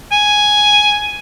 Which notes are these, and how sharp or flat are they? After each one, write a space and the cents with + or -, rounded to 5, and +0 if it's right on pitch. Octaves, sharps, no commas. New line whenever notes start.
G#5 +5